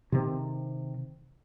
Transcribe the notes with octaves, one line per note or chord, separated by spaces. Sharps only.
C3 D#3 C4